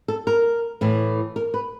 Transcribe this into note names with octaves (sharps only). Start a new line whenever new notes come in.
A4
A#4
A2 E3
A#4
B4